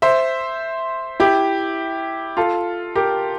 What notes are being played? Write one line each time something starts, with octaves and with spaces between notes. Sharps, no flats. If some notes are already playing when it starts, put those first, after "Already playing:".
C5 E5
E4 G4
F4 A4
G4 A#4